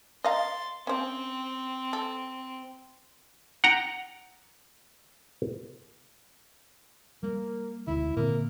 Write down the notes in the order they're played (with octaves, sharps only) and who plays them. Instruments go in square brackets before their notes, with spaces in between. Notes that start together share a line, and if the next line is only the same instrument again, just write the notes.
[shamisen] D#5 F5 A#5 [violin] C6 A6
[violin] C4 [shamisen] C#4 C5
[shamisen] A4
[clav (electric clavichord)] F#5 G5 A#5
[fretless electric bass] G3 [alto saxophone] A#3
[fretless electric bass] E1 D2 [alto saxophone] E4
[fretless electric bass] A#2 D3 C4 [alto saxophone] A#3